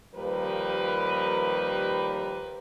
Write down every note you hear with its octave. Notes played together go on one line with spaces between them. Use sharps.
D#2 F3 G3 A#4 B4